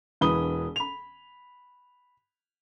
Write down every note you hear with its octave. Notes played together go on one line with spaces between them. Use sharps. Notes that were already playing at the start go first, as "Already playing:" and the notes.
E1 E3 B5 D#6 G7
B5 F7